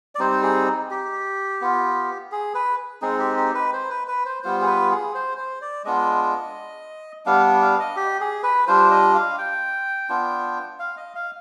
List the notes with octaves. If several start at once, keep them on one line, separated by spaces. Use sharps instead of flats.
D5
G3 C4 D#4 C5
G#4
G4
B3 F4
G#4
B4
G#3 C4 D#4 G#4
G4
G4
B4
C5
B4
B4
C5
G3 B3 F4 C5
G#4
B4
G#4
C5
C5
D5
G#3 B3 D4 F4 D#5
G3 B3 D4 F5
F5
D#5
G4
G#4
B4
G3 D4 F4 C5
D#5
F5
G5
B3 D4 F4
F5
D#5
F5